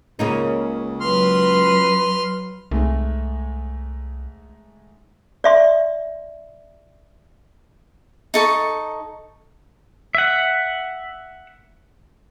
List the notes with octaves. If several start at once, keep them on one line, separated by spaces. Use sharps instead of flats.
C#2 C#3 A#3 D#4
F#3 B4 C6 F6
C2 G#2 G#3 A3
D5 E5 C6
D#4 A4 C#6
E5 F#5